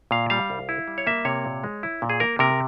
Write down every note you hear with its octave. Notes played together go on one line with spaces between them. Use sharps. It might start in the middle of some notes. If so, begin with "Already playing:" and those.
A#2 F5
G3 F5
C2
E4
G3
C#5
A#3 E5
C3 C#5
A#2
G#3
E4
A#2
G#4
A#3 A#4
C3 A#4